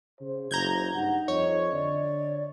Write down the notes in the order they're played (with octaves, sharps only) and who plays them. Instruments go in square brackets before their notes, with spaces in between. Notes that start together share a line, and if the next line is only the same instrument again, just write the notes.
[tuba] C#3 [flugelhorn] C5
[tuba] F#1 [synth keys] A#5 G6 G#6
[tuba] G2 [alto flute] D#4 [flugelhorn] F#5
[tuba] F2 [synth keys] C#5 [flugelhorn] D#5
[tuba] D3 [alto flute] D5